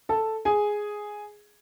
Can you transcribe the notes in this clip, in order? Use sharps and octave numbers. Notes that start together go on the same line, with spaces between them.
A4 A5
G#4 G#5